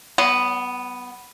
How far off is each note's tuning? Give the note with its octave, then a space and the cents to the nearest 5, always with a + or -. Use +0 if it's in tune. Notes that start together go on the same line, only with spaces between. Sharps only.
F#3 +45 B3 +0